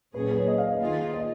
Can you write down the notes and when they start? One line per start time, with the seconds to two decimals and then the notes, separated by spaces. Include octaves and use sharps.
0.14 A#2 F#3 C#4 G#4 B4
0.31 B4
0.39 C#5
0.48 D#5
0.58 F5
0.70 D#5
0.81 D#3 A#3 F4 G#4
1.14 D#5